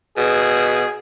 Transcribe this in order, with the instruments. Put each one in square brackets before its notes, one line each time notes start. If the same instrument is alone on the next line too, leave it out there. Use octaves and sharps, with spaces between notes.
[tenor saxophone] B2 [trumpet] G#4